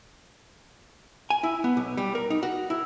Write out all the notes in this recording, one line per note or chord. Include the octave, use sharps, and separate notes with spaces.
G#5
E4
B3
B1
G3
A#4
D#4
F#4
E4